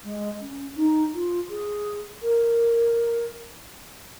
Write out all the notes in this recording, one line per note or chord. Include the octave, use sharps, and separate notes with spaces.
G#3
C#4
D#4
F4
G#4
A#4